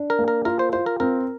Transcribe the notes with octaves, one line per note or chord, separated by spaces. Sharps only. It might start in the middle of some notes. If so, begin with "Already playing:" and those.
Already playing: D4
A#4
A#3
A#4
F4 A#4
C5
F4 C5
A#4
C4 A#4